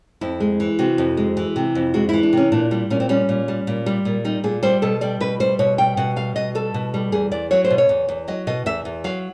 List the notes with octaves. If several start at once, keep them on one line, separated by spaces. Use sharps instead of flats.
F2 E4
G#3
E3
C3 F#4
F2
G#3
E3
C3
F2
G#3 F#4
E3 E4
D4
C3 C#4
A#2 D4
G3 D4
A#2 C#4
C4
G3 C#4
A#2
G3
A#2
G3
A#2
G3 D#4
A#2 G#4
G3 C5
B2 A4
G3 D5
B2 B4
G3 C5
B2 C#5
G3 G5
B2 F#5
G3 F5
B2 D#5
G3 A4
B2
G3
E2 G#4
E2 D5
F#3 C#5
C5
B2
C#5
E2
E2
F#3 D#5
B2 D#5
E2 E5
E2
F#3 F5